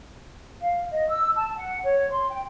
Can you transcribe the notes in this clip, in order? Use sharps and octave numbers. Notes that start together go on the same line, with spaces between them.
F5
D#5
E6
A5
F#5
C#5
C6
G5